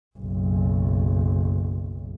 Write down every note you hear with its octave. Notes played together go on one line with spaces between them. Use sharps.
F#1 B1